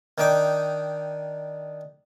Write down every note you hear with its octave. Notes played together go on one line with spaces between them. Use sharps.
D#3 D4 D#4 G5 D6